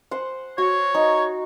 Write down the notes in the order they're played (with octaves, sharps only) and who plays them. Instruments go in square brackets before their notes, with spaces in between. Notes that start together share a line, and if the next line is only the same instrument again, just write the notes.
[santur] C5 F#5
[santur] F#4 [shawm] C#5
[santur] D#4 C#6